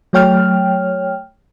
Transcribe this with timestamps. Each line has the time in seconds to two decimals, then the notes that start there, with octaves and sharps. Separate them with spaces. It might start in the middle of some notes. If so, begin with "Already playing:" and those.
0.13 F#3 A3 C#5 G5 F6